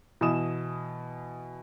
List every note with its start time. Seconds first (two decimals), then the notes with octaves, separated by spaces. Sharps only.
0.21 B2 E3 D#6 E7